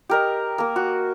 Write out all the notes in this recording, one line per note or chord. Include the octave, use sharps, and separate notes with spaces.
G4 A#4 D#5
A#3 A#4
F#4